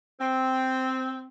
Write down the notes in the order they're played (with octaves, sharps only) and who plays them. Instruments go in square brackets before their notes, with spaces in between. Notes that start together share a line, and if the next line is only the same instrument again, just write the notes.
[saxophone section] C4